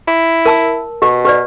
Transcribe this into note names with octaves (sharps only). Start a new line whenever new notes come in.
E4
A#4 A5 E6
B2 G4
G4 B4 D5